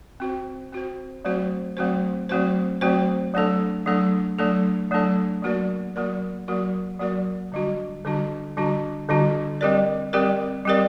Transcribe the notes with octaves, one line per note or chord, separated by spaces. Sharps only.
C4 F#4 C5
C4 F#4 C5
F#3 A3 C4 F#4 C5
F#3 A3 C4 F#4 C5
F#3 A3 C4 F#4 C5
F#3 A3 C4 F#4 C5
F#3 A3 D4 A4
F#3 A3 D4 A4
F#3 A3 D4 A4
F#3 A3 D4 A4
F#3 A#3 F#4 A#4 D5
F#3 A#3 F#4 A#4 D5
F#3 A#3 F#4 A#4 D5
F#3 A#3 F#4 A#4 D5
D3 G3 D4 F#4
D3 G3 D4 F#4
D3 G3 D4 F#4
D3 G3 D4 F#4
G3 C4 G4 A#4 D5
G3 C4 G4 A#4 D5
G3 C4 G4 A#4 D5